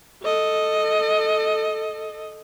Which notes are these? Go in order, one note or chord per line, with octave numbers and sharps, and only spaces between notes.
A4 D#5